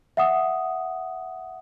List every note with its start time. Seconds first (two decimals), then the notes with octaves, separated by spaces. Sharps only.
0.17 E5 F#5 D#6